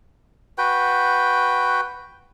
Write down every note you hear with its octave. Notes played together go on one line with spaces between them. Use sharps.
F#4 B4 G5